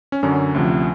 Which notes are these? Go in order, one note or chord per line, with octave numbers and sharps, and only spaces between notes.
C#4
F#2 D3 F#3 C#4
D2 C3 F3